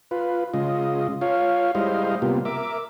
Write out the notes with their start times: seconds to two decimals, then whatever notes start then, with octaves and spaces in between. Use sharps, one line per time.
0.11 F4 B4
0.54 C#3 G#3 F4 D#5
1.21 F4 C#5 F5
1.75 G3 G#3 E4 C5 D#5 F5
2.22 C3 G3 A#3 B3 F4
2.45 A#4 E5 D6